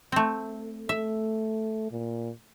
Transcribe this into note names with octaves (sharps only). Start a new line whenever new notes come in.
A3 C4
A3 E5
A#2